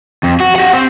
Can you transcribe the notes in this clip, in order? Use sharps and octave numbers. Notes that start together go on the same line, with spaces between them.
F2
F#4
G4 F#5
C4